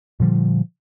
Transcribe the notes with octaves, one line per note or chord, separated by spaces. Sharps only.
A#2 D3 F3 G3